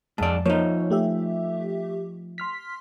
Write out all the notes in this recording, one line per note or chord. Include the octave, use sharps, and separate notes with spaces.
F2 G#2 D5 A5
F3 A#3 D#4 C#5
A3 G4 E5
C6 F6 B6